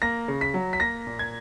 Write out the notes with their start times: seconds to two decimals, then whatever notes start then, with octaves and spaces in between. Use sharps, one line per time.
0.02 A#3 A#6
0.28 C#3
0.41 B6
0.54 F#3
0.73 B6
0.80 A#3 A#6
1.07 A#2
1.19 G#6